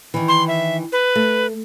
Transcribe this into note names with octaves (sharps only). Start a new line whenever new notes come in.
D#3 E3
C6
E5
B4
A3